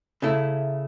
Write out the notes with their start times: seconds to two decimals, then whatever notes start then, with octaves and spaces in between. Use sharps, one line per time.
0.22 C#3 A3 E4